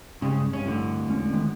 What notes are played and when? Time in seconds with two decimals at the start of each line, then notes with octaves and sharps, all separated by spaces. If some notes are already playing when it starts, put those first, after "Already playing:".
0.22 G2 C#3 G#3
0.53 A#1 G2 C#4
0.66 A2 D3
1.08 E2 G#3 C#4
1.33 D#3 G#3 B3